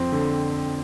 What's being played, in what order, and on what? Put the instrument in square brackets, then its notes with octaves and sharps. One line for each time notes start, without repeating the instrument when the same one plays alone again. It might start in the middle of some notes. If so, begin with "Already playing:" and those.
Already playing: [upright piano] F2 C4
D3